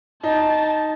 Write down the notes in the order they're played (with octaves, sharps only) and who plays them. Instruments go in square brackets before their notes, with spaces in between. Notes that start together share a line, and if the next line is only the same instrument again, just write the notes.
[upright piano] D#4 [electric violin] A5